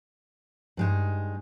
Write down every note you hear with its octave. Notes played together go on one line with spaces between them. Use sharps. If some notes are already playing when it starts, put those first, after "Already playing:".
G2 G#3 D#4